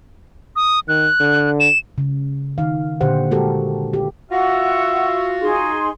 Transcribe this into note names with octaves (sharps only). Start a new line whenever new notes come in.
D#6
D#3 F#6
D3
E7
C#3
D#3 F5
A#2 D3 G4 C5 F#5
G#3 F#4 G4 A4 A#4
F4 G4
F4 F#4 E5 F#5
D#4 G#4 C6